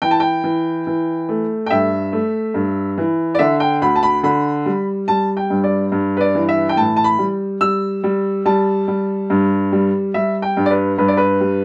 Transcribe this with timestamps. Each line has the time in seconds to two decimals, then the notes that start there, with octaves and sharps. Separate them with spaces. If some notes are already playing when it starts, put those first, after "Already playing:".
0.02 E3 G5
0.11 A5
0.20 G5
0.44 E3
0.87 E3
1.29 A3
1.66 G5
1.70 G2 E5
2.13 A3
2.54 G2
2.98 E3
3.35 D5
3.39 D3 E5
3.60 G5
3.81 D2 B5
3.96 A5
4.03 B5
4.23 D3 B5
4.66 G3
5.08 G3 A5
5.37 G5
5.50 G2
5.64 D5
5.92 G2
6.17 B4
6.21 D5
6.35 E3
6.49 E5
6.69 G5
6.77 A2 A5
6.96 A5
7.04 B5
7.18 G3
7.61 G3 E6
8.04 G3
8.45 G3 A5
8.88 G3
9.30 G2
9.72 G3
10.14 G3 E5
10.42 G5
10.57 G2
10.66 D5
10.71 B4
10.98 G2 B4
11.08 D5
11.17 B4
11.41 G3